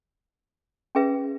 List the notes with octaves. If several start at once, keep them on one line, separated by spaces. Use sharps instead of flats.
C#4 G#4 B4 E5